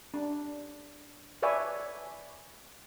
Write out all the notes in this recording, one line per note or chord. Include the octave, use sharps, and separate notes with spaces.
D4
B4 C#5 D5 E5 G#5